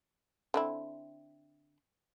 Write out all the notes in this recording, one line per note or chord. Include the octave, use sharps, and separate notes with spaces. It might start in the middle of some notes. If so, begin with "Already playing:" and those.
D3 C4 E4